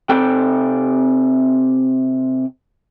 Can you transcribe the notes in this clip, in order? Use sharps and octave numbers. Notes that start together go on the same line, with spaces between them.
C3 C4 A4 G5